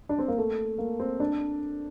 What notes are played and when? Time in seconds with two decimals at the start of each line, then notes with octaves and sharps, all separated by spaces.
0.09 D4
0.19 C4
0.28 A#3
0.38 A3
0.78 A#3
0.99 C4
1.20 D4